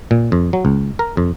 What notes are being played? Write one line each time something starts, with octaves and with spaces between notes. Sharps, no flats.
A#2
F2
F#3
C#2
A#4
F2